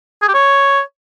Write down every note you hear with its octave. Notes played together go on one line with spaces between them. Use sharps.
G#4
G4
C#5